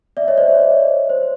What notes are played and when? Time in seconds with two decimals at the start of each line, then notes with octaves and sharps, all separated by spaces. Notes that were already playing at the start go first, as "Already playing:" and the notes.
0.17 D5 E5
0.28 C#5 D#5
0.37 C5 D5
0.48 C#5
1.10 C5